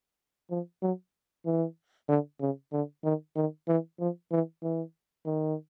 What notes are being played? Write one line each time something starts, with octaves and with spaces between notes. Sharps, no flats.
F3
F#3
E3
D3
C#3
D3
D#3
D#3
E3
F3
E3
E3
D#3